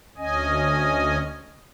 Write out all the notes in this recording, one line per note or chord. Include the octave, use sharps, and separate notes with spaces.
D2 C#4 D#5 G#5